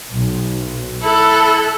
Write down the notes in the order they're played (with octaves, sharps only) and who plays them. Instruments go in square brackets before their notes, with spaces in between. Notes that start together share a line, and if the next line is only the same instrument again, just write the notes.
[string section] B1
[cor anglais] E4 [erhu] A4 [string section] F#6